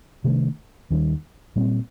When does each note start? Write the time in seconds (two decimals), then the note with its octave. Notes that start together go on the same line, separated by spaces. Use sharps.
0.24 C3 D#3 A3 D4
0.90 D#2 D#3 G3
1.56 A#2 G3 C4